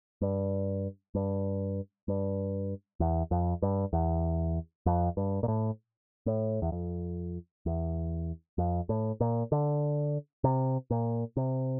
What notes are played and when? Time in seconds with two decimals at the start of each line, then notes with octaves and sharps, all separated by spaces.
0.21 G2
1.15 G2
2.08 G2
3.00 E2
3.31 F2
3.62 G2
3.93 E2
4.86 F2
5.17 G2
5.43 A#2
5.48 A2
6.26 A2
6.62 E2
6.72 F2
7.66 E2
8.58 F2
8.89 A2
9.20 A#2
9.52 D3
10.44 C3
10.91 A#2
11.37 C3